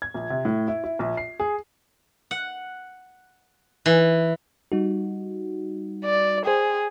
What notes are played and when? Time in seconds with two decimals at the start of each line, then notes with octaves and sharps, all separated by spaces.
0.02 G#6
0.14 A#1
0.30 C3
0.45 A2
0.68 E4
0.84 E4
0.99 A#1
1.17 C7
1.40 G#4
2.31 F#5
3.86 E3
4.72 G3 D#4 F#4
6.05 D5
6.45 G#4 C5 G5